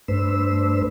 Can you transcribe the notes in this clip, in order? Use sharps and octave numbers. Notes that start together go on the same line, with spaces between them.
G2 A3 D4 B4 C5 E6